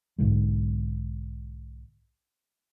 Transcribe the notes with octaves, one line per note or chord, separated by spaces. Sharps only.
B1 G#2 D3 G#3